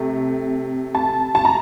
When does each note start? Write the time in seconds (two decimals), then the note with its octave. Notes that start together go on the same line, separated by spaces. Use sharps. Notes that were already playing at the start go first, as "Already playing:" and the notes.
Already playing: C3 A3
0.95 A5
1.35 A5
1.45 A#5